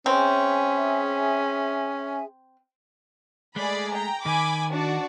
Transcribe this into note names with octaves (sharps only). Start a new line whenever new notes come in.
C4 C#4 G#4 E5 G#5
G#3 A3 G#4 D5 B5
G5 A#5
D#3 G#5 B5 D6
D4 F#4 D5